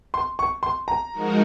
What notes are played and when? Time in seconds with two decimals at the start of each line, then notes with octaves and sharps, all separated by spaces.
0.14 C6
0.39 C#6
0.63 C6
0.88 A#5
1.12 F3 G#3 D#4 F#4 A#4